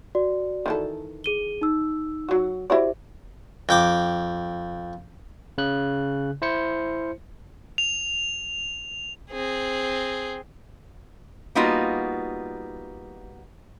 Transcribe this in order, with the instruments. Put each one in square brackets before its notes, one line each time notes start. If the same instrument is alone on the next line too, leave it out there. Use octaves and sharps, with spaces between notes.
[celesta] F#4 D5
[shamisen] D#3 E3 A4
[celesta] G#4 D#7 G7
D#4 E6
[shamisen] F#3 F#4
[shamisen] E4 F#4 D5 [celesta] G4 C5 E5
[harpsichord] F2 G5 D6
[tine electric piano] C#3 F#6
E4 C5 C#7
[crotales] F7
[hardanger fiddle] C4 G#4
[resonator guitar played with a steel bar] G3 A#3 B3 D#4 F4 F#4